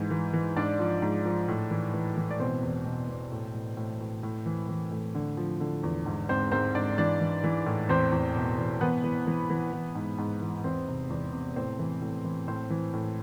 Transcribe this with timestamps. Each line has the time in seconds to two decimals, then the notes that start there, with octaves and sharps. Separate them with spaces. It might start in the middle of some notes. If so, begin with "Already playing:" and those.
Already playing: G#2 E3
0.11 E3
0.33 E3
0.56 G#2 D4 D5
0.79 F3
1.02 G#2
1.25 F3
1.48 A2
1.71 E3
1.94 E3
2.17 E3
2.31 D5
2.40 B2 C4 C5
2.63 E2
2.86 B2
3.08 B2
3.31 A2
3.54 A2
3.77 A2
4.00 A2
4.23 A2
4.46 E3
4.69 E3
4.92 A2
5.15 D3
5.37 F3
5.60 D3
5.83 E2
6.06 G#2
6.29 G#2 C4 C5
6.52 G#2 C4 C5
6.75 G#2 D4 D5
6.98 E3 D4 D5
7.21 E3
7.44 E3
7.66 A2
7.89 E2 C4 C5
8.12 E2
8.36 B2
8.58 E2
8.81 E3 B3 B4
9.04 E3
9.27 E3
9.50 E3
9.73 E3
9.95 G#2
10.18 G#2
10.41 E3
10.64 E2 C4 C5
10.88 C3
11.10 E2
11.33 C3
11.56 A2 C4 C5
11.79 E3
12.02 A2
12.25 E3
12.48 A2 C4 C5
12.70 E3
12.94 A2